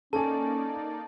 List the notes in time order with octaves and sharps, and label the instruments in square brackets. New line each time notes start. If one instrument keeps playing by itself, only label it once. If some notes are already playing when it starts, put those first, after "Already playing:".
[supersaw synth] A#3 D#4 D5 [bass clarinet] C#4 [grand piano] A4 G#5 [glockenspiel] A5